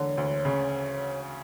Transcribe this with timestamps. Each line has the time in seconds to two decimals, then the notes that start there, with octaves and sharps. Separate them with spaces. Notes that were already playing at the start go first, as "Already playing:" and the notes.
Already playing: E1 D3 C#5
0.17 D2
0.45 C#3